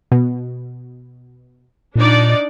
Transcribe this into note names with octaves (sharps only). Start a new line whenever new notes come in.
B2
A#2 D4 D#4 D5